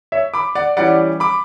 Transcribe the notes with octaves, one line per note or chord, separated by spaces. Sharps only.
C#5 E5
B5 D6
D5 F#5
E3 G3 C#4 D5 F#5
B5 D6